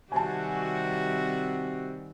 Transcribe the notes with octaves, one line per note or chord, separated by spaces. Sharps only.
C3 D#3 G3 C4 F#4 G#5 A5